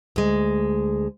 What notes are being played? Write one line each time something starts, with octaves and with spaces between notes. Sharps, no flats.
D2 G#3